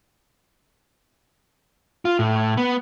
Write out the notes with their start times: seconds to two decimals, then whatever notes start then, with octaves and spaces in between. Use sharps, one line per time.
2.05 F4
2.19 A2
2.57 B3